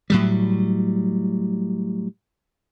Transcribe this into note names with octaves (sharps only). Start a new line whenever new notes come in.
A2 F#3 G3